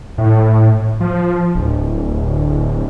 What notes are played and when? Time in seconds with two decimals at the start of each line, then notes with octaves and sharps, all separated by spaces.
0.18 A2
1.00 F3
1.55 D1